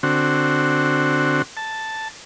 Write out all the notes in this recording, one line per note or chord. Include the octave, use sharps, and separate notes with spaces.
D3 C4 F#4
A5